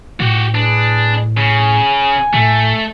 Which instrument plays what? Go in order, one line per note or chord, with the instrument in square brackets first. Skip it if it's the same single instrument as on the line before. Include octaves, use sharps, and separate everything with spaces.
[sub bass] A2 [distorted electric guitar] F#4 G4
[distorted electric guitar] D4 [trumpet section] G#4 B4
[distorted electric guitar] C#3 [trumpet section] G#5
[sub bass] A2 [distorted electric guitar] A3